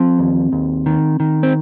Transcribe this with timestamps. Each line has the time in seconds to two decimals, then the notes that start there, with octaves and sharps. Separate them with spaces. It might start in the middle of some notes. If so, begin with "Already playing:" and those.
Already playing: F3 C4
0.19 D#2
0.52 D#2
0.86 D#3
1.20 D#3
1.43 C4